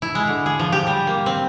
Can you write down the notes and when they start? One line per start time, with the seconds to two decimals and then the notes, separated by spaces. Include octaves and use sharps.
0.02 E4
0.15 G#3
0.27 D3
0.46 G#4
0.59 F3
0.72 G4
0.87 G3
1.07 A#3
1.26 C4